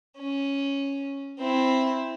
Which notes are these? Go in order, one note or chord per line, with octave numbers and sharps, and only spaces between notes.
C#4
C4 E4